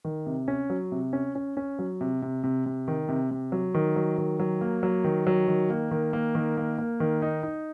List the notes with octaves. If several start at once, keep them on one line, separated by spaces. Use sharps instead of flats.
D#3
C3
C#4
F#3
C3
C#4
C#4
C#4
F#3
C3
C3
C3
C3
D#3
C3
C3
F#3
D#3
F#3
D#3
F#3
A#3
F#3
D#3
F#3
D#3
A#3
D#3
A#3
D#3
A#3
A#3
D#3
D#4
D#4